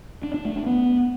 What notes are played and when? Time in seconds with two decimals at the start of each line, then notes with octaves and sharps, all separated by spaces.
0.23 D4
0.34 D4
0.45 A3
0.56 D4
0.66 B3